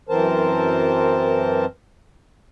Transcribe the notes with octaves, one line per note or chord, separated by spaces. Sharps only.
F#2 E3 C4 A#4 C5 A5